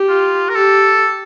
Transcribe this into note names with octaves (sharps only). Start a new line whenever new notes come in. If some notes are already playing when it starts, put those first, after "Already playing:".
Already playing: G4
F4
A#4
G4 A4